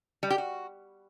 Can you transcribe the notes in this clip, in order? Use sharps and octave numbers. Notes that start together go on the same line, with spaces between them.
G3
G4
F#4